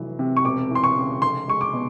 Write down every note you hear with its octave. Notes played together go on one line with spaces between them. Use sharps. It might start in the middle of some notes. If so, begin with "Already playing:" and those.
Already playing: F1 E3 F#3
C3
C#6
E1 D6
E3 C6
C#6
C#3
F1 C6
G#3 C#6
D6
B2